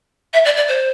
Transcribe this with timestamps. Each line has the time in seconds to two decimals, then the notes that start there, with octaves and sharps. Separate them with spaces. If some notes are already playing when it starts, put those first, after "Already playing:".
0.33 E5
0.45 D5
0.56 D5
0.68 C5